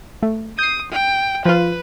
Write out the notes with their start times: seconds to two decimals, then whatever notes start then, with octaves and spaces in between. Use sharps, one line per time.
0.23 A3
0.59 D#6 G6 C7
0.92 G5
1.45 F3 F4 B4